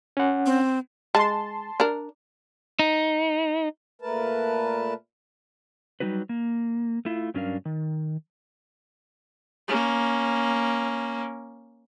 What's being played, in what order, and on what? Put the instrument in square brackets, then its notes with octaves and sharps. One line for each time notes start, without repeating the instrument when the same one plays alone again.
[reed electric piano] C#4 F#5
[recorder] C4
[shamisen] G#3 [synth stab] A5 C6
[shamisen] D4 A#4
[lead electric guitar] D#4
[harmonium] A#2 A3 A#4 B4 A5
[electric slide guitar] F#3 G3 D#4 F#4 B4
A#3
A3 E4 F4
G2 F#3 C#4 D4 A#4 F5
D#3
[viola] A#3 C#4